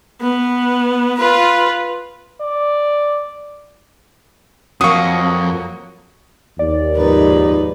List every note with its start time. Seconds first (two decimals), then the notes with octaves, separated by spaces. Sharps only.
0.21 B3
1.17 F4 B4
2.42 D5
4.81 F2 F#3 A#3 C#6 D#6
6.59 D#2 D5
6.97 F2 G#2 D#4 B4